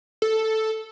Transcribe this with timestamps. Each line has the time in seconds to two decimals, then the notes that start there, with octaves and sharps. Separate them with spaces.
0.22 A4